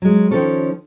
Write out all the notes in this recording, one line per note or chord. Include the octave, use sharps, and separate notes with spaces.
F#3 G#3
D#3 F3 F#3 C#4 A4 C#5